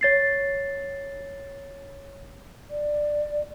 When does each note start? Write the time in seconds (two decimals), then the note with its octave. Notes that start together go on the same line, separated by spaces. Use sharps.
0.01 C#5 A6 C7
2.70 D5